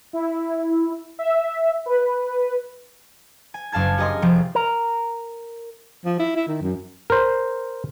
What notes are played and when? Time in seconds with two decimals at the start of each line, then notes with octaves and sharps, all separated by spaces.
0.13 E4
1.19 E5
1.86 B4
3.54 G#5
3.72 F#1 F#2 F5 A5 G#6
3.98 C#4 G4 A#4 D#5 G#5 C6
4.22 F1 C3 F3 G4 D7
4.55 A#4
6.05 F3
6.19 E4
6.36 E4
6.47 D#3
6.61 F#2
7.10 A#4 C5